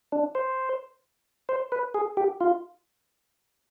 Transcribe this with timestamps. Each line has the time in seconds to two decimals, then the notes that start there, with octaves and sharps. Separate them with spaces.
0.12 D4
0.35 C5
1.49 C5
1.72 B4
1.94 G#4
2.17 G4
2.41 F4